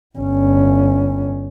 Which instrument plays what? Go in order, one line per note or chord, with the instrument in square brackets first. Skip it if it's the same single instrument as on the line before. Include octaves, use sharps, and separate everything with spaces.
[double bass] G1 C#4